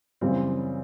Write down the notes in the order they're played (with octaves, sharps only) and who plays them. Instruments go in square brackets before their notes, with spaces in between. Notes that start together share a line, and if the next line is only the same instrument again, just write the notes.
[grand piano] F#2 C#3 E3 G3 C4